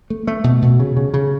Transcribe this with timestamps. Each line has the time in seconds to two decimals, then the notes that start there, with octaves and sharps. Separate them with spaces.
0.10 A3
0.27 A3
0.44 B2
0.62 B2
0.80 C#3
0.97 C#3
1.14 C#3